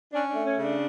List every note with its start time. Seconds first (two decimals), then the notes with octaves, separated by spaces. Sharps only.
0.13 C#4 D4
0.29 D4
0.35 A3
0.45 C#4
0.56 C#3
0.62 D4